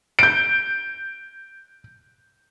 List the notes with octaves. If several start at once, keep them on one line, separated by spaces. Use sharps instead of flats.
G6 D7